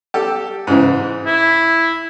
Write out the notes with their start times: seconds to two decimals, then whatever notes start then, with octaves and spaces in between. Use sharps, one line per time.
0.14 G4 A4
0.67 G#2 C#3 E3
1.26 E4